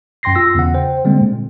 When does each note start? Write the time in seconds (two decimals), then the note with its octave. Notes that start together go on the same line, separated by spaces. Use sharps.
0.23 F#2 G5 C6 A#6 C7
0.35 F4 E6 A#6
0.55 E2 C#3 F#5
0.74 C5 G5
1.05 D3 G3 G#3 A#3 C4
1.21 A#2